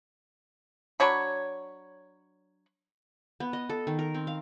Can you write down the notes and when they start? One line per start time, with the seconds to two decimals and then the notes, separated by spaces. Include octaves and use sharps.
1.00 F#3 D4 C#5 B5
3.40 B3
3.53 D#5
3.69 A4
3.87 D#3
3.99 A#4
4.14 C4
4.27 F5